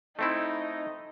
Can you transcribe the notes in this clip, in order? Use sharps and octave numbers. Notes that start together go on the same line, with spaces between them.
A3 C4 D#4 E4